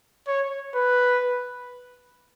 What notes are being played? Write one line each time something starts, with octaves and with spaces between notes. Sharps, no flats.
C#5
B4